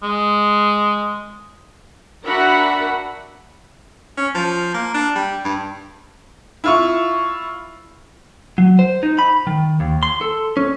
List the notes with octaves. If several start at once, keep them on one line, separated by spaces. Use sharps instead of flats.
G#3
D4 F#4 A#4 E5 F#5 B5
C#4
F3
A#3
D4
G3
G2
E4 F4 C#6
F#3
C5
D#4
B5
D#3
D#2
C6
A4
C#4